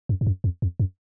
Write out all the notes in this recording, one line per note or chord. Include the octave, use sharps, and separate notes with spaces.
F#2
G2
F#2
F2
F2
F#2